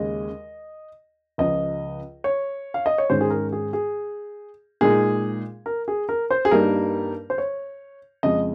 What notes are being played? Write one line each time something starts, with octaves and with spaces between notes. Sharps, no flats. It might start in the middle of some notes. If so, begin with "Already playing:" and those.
Already playing: D#2 C#3 G#3 D#5
C#2 C#3 F3 D#5
C#5
F5
D#5
C#5
G#2 D#3 G#3 C#4 C5
G#4
A#4
G#4
G#4
A#2 G#3 D#4 G#4
A#4
G#4
A#4
C5
G#4
G2 G3 A#3 D#4 A#4
C5
C#5
F2 C#3 G#3 D#5